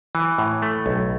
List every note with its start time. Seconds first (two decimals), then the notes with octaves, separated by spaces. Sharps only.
0.15 E3
0.38 A2
0.62 A3
0.86 B1